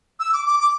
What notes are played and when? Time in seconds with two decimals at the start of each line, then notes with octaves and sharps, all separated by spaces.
0.20 E6
0.33 D6
0.46 D6
0.60 D6